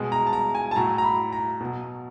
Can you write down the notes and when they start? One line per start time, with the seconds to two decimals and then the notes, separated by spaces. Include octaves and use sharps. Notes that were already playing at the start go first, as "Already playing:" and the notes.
Already playing: B2 G#3
0.12 A#5
0.27 A5
0.33 A#5
0.55 G#5
0.71 A5
0.76 A2 F#3 A#5
0.98 A#5
1.04 B5
1.32 A#5
1.60 B2 F#3